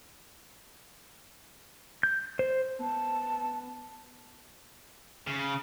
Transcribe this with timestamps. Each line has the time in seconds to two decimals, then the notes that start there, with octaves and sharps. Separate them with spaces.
2.03 G6
2.39 C5
2.79 B3 A5
5.27 C#3